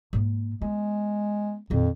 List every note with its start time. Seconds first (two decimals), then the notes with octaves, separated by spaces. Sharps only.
0.13 G#2 A#3
0.62 G#3 B3
1.70 F2 A#2 D#3